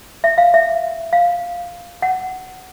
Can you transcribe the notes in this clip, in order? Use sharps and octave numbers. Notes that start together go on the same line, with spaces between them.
E5
F5
E5
F5
F#5